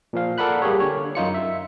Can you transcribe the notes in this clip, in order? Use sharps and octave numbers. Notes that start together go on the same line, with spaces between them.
A#2 F3 F5
A4 A#4 D5 F#5 B5 F#6
G3 A#3 G4 G#4 C#5
D3 C#5
F#2 D#4 F4 C#7
E5